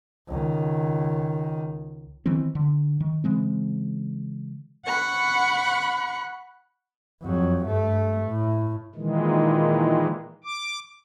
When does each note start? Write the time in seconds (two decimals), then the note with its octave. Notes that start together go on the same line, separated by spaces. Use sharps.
0.28 C#2 D#3
2.26 D#3 E3 B3 C4
2.55 D3
3.01 D#3
3.24 C#3 E3 G#3 C4
4.86 F#5 B5 C#6 F#6
7.22 F2 F#3
7.66 G2 A3
8.27 A2
8.95 A#2 D#3 E3 G#3
10.44 D6